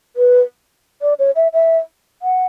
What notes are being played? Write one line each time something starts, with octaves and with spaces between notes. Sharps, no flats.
B4
D5
C#5
E5
E5
F#5